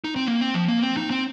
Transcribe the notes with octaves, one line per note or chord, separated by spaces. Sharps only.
D#4
C4
A#3
C4
F3
A#3
C4
D#4
C4